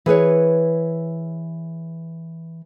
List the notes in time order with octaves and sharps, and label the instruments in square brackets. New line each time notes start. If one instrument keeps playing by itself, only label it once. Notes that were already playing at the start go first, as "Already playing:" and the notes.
[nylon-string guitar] E3 G#4 B4 C#5